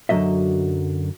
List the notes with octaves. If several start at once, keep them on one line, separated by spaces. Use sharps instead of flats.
F#2 D3 F3 F#3 D#5 E5